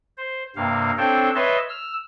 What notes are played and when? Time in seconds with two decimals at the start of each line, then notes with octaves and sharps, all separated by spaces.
0.17 C5
0.56 G2 C3 A#3 F5
0.98 C4 D4 A4 C5 C#5 G5
1.35 B4 C#5 D#5 E5 A5 C6
1.69 E6 F6